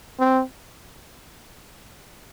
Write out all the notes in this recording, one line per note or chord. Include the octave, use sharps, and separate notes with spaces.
C4